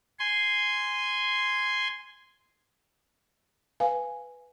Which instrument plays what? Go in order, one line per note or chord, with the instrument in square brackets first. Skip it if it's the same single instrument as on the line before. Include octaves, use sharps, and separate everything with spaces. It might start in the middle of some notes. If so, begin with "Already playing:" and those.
[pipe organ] G#5 C6
[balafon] B4 F5 G#5